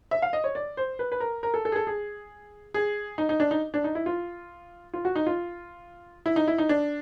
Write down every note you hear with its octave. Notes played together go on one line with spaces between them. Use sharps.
E5
F5
D#5
C#5
D5
C5
B4
B4
A#4
A#4
A4
A4
G#4
A4
G#4
G#4
D#4
D#4
D4
D#4
D4
D#4
E4
F4
F4
F#4
D#4
F4
E4
D#4
E4
D#4
D4